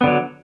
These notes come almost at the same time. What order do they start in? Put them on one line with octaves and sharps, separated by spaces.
B3 D3 F#3